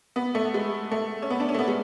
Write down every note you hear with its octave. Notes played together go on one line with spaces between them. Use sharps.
B3
A3
G#3
A3
C#4
B3
D4
C#4
A3
B3
G#3